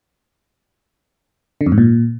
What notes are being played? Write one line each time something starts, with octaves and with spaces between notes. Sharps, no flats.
D3
F2
G#2
A#2